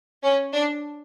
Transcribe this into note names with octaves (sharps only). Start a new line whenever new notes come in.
C#4
D4